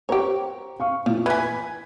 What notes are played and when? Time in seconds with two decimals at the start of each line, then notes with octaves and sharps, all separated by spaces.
0.09 G4 C5 C#5 A#5 C#6
0.80 F5 C#6
1.06 A#2 F3 E4
1.26 E3 B4 G#5 G#6 B6